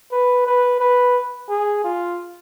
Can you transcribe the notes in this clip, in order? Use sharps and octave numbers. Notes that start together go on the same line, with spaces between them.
B4
B4
B4
G#4
F4